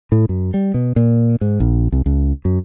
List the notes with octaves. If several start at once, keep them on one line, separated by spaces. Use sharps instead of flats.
A2
F#2
G3
B2
A#2
G#2
A#1
C2
C#2
F#2